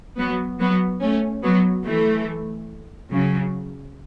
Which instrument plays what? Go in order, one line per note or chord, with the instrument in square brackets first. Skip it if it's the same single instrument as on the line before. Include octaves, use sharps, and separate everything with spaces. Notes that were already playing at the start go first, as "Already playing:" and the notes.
[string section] F#3 B3
F#3 B3
A3 C#4
F#3 B3
E3 A3
C#3 F#3